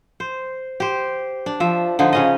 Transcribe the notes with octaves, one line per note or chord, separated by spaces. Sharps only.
C5
G4 C5
D4
F3 E5
D3 F3 D#4
C#3 C#4 D#5